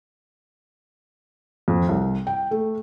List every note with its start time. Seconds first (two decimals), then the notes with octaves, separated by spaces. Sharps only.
1.68 F2
1.89 C2
2.27 G5
2.51 A3